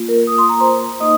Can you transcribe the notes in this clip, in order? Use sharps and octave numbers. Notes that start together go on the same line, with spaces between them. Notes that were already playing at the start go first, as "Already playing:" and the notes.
Already playing: A#3 F4
A#4
D#6
C6
A#5
C5 C6
A#3 D#4 D#5 D#6